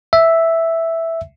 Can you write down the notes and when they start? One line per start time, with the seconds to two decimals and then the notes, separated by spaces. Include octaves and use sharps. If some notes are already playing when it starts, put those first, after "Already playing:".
0.13 E5